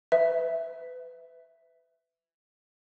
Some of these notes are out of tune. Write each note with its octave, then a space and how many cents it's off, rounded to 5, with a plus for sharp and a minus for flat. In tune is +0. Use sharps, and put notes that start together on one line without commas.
B4 +25 E5 +0